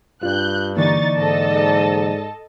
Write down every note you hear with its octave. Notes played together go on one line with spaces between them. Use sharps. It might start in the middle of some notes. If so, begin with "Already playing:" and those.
G2 D4 F4 F#6 G6
D3 E3 A#3 D#4 D5 C#6 A6
G#2 A4 D#5 A5